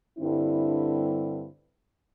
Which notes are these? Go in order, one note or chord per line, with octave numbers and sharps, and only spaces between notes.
G2 D3 G3 C4 E4